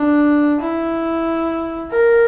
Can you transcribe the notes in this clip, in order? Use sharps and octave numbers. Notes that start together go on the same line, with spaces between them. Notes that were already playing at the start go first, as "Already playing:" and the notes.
Already playing: D4
E4
A#4